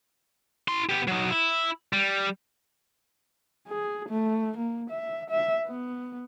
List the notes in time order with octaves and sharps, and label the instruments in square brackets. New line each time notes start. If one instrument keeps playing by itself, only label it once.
[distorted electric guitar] E4 C6
B3 G4
F#3 D#4
E4
G3
[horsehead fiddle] G#4
A3
A#3
E5
E5
B3